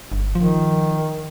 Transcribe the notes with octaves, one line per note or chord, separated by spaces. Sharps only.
G1
D#3 F3